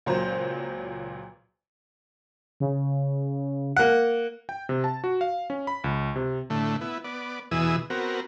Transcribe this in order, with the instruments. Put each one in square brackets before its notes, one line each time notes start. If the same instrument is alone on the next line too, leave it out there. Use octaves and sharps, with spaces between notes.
[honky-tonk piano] C#2 A#2 F#3 C5 A#5 G6
[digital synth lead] C#3
[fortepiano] A#3 F#5
[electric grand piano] G5
C3
A5
F#4
F5
C#4
B5
C#2
C3
[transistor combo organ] A2 D3 A3
B3 E4
B3 D5
E2 B2 E3 G#4 D#6 E6
B3 C4 F#4 A#4